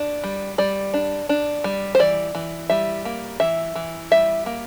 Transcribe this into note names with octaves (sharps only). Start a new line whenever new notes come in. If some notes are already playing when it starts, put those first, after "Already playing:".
Already playing: D4
G3
G3 D5
D4
D4
G3
C5
E3 D5
E3
G3 E5
A#3
E3 E5
E3
G3 E5
A#3